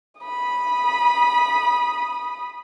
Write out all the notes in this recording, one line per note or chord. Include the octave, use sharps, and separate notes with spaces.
B5 D#6